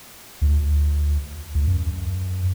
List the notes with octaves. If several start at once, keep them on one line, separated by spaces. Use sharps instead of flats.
D2
D2
F#2